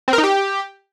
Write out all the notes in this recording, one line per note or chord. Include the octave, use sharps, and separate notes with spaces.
C4
A#4
D#4
G4